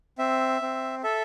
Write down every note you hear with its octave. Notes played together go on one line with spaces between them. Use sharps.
C4 E5
C4
A4 E5